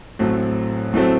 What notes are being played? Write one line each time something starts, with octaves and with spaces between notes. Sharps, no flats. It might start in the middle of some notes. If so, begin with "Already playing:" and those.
A1 A2 F#3 A3 C4
A1 A2 F#3 A3 C4